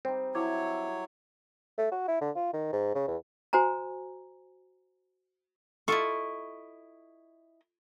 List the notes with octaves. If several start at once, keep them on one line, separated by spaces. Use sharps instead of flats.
G3 C4 D#4
F#3 E4 C#5 E5 D6 G#6
A3
F#4
E4
D3
F4
D#3
G#2
C#3
E2
F#4 C5 G#5 A#5
E4 F4 A4 D#5 C#6